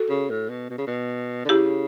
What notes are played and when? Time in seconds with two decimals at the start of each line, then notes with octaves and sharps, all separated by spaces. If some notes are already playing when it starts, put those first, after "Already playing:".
Already playing: F#4 A4
0.09 C#3
0.30 A2
0.49 B2
0.70 B2
0.78 C#3
0.87 B2
1.45 D3
1.49 C#3 E4 G4